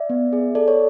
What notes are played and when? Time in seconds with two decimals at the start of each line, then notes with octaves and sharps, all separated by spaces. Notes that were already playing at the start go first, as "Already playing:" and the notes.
Already playing: D5 E5
0.10 B3
0.33 G#4
0.55 A4 D5
0.68 C#5